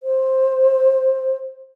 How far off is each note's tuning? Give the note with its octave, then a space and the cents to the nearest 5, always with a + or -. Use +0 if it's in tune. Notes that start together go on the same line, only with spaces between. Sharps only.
C5 +10